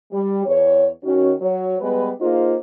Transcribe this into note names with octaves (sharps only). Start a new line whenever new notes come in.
G3
E2 C#5
D#3 C#4 F#4
F#3 C#5
G3 G#3 B3 B4
A#3 D#4 F4 G#4 C5